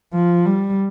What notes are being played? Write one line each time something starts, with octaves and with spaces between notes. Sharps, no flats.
F3
G3